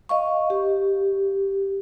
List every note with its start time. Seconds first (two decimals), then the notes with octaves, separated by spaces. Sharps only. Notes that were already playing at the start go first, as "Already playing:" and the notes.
0.09 D#5 F5 C#6
0.50 G4